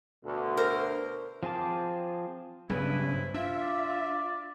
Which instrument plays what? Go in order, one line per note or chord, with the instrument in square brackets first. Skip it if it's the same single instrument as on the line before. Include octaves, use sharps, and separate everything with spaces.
[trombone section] D2 B2 D3
[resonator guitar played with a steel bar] A#4 C5
[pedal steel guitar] F3 C4 G#4 A5 D6
[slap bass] B1 F#3 B3 [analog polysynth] G2 C#3 [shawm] E4 [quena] B4
[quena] C5
[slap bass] D4 [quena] F4 [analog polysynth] E5
[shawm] D5